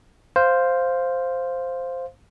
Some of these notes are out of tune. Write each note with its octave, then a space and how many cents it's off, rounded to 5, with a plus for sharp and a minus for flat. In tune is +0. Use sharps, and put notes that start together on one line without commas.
C5 +0 F5 +0